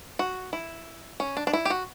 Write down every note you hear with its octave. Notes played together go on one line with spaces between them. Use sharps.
F#4
E4
C#4
D4
D4
E4
G4
F#4